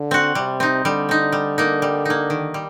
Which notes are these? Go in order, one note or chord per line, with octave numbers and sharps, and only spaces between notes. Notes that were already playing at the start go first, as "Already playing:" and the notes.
Already playing: D3
C4 F#4
C3 G3
C4 D#4
D3 G3
C4 D#4
G3
A#3 D#4
G3
A#3 D#4
D#3
G3